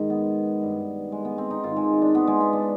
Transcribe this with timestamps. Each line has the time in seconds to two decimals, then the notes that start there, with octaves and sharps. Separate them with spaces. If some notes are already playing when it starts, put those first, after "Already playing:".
Already playing: G#2 D#3
0.10 B3
0.61 G2 D#3
1.12 G#3
1.25 B3
1.38 C4
1.50 D#4
1.63 G#2 D#3 F4
1.76 G#3
2.02 D4
2.15 B3
2.27 G#3
2.40 B3
2.53 D4